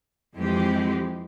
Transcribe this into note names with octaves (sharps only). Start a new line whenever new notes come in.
F2 E3 G#3 C4 G4